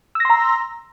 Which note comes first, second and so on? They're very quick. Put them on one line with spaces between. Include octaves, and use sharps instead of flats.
E6 A#6 C6 A#5